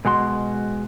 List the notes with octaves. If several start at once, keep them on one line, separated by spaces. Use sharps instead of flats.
B2 G#3 F#4 C6